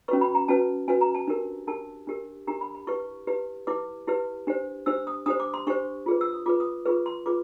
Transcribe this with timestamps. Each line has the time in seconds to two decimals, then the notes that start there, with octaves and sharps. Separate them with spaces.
0.08 C#4 F#4 B4 C#6
0.21 B5
0.35 A#5
0.48 C#4 F#4 B4 A5
0.88 C#4 F#4 B4 G#5
1.01 A#5
1.14 A5
1.27 D4 G4 A#4
1.67 D4 G4 A#4 A5
2.07 D4 G4 A#4
2.47 D4 G4 A#4 A#5
2.61 B5
2.75 B5
2.87 E4 G4 B4 C#6
3.27 E4 G4 B4
3.67 E4 G4 B4 D6
4.07 E4 G4 B4
4.47 D4 G4 C5
4.86 D4 G4 C5 E6
5.07 D#6
5.26 D4 G4 C5 D#6
5.40 D6
5.54 C6
5.67 D4 G4 C5 C#6
6.06 F4 G#4 B4
6.21 E6
6.33 D#6
6.46 F4 G#4 B4 D6
6.60 D#6
6.85 F4 G#4 B4 C#6
7.06 C6
7.26 F4 G#4 B4 D6